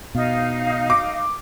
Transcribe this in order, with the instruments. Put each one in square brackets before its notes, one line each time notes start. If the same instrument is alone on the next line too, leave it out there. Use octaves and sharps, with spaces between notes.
[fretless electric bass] B2 [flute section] D#4 F5
[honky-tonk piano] D6